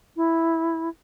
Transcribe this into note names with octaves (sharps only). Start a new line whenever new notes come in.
E4